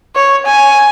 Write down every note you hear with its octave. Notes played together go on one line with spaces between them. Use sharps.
C#5
G#5